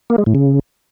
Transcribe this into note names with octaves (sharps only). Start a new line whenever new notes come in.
A#3
G#3
A2
C#3